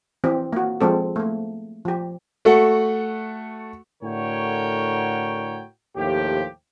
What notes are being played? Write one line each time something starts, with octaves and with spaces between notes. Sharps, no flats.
E3 C4 G4
A#3 F#4
F3 G#3 C4 A4
A3 A#3
F3 G4
A3 F#4 A4 F#5
A2 D3 F#4 A#4 C#5 G5
D#2 A2 F3 G4